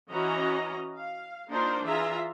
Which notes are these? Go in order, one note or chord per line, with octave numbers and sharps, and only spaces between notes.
E3 C#4 F#4 D#5 A#5
F5
A#3 D4 D#4 F4 A#4 C5
E3 F4 G#4 E5 A#5